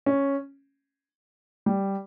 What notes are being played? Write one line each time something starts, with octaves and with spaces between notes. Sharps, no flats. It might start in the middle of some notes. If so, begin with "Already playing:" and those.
C#4
G3